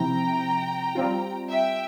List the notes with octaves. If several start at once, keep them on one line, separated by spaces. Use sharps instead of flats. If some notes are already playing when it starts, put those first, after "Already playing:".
Already playing: C3 F3 C4 E4 G5 A#5
G3 C4 F4
E5 G5